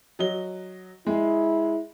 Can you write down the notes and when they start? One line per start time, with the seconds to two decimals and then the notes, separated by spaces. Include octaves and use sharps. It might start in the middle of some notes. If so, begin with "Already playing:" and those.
0.19 F#3 D#5 G7
1.06 G#3 E4 G#4